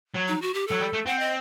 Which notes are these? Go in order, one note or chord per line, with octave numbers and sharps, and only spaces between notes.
F#3
D#4
F#4
G4
F#3 A4
G3
A3
C4 F#5
D#5